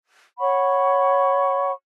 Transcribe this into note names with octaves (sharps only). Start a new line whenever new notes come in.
C#5 F#5 B5 C#6